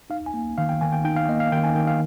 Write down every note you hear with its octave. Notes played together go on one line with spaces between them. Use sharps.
D#4 F5
G#5
A#3
D#3 F5
G5
D#3 G#5
G5
D#4 G5
F5
A#3 D#5
F5
D#3 G5
G#5
D#3 G5
F5